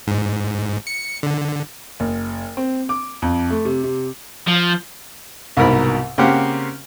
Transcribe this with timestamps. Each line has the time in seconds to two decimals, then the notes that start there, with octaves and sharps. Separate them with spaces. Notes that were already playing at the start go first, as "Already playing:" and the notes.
0.07 G#2
0.87 C#7
1.23 D3
2.00 F#1
2.57 C4
2.89 D6
3.22 F2
3.50 A3
3.65 C3
3.84 C3
4.47 F3
5.57 C2 G#2 B2 A#4 B5
6.18 C#3 A#3 C4 G4 C5 F#5